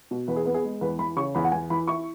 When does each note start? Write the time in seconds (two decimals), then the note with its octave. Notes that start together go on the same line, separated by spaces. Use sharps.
0.11 B2
0.28 E2 B4
0.36 G#4
0.45 B3 B4
0.54 G#4
0.64 G#3
0.81 E2 B4
0.99 E3 B5
1.16 C#3 C#6
1.35 E2 B5
1.44 F#5
1.52 E2 G#5
1.70 E3 B5
1.87 E4 C#6